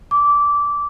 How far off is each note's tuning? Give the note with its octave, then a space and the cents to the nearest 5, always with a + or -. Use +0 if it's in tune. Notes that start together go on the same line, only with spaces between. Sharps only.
D6 -15